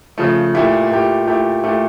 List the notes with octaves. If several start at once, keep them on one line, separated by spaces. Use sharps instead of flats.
C#3 F3 A3
A#2 A3 E4 G4
A#2 A3 E4 G4
A#2 A3 E4 G4
A#2 A3 E4 G4